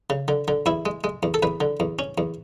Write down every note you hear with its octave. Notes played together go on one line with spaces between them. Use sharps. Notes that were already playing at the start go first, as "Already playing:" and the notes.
C#3
D3
D3
E2 E4
G#3
G#3
E2
A4
E2 B4
D3
E2
C#4
E2